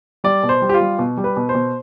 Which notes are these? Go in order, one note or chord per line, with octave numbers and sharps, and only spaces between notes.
G3 D5
B2
C5
G3
G4
F4
G3
B2
G3
B4
B2
C5
B2